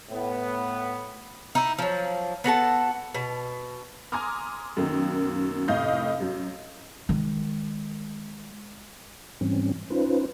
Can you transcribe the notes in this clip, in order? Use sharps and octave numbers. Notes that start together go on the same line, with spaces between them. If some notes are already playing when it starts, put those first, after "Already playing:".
A2 B3
D#4 E4
F3 F#3
B3 F#4 A4 A5
B2
G#5 A#5 C6 D6 D#6 F6
F#2 B2 D#3 A#3
F1 A2 D#5 F5 G6
F#2 F#3
D#3 G#3
G#2 E3 G3 C4 C#4
C#4 D#4 F4 B4 C5